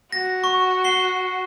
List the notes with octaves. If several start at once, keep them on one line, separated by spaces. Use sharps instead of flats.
F#4 A#6
C#6
C7 G7